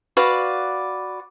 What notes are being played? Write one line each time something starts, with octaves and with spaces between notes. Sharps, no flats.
F#4 B4 D5 F5